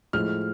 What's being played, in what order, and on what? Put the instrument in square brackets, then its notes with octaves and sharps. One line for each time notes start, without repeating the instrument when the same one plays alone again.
[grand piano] A2 F3 G#3 F6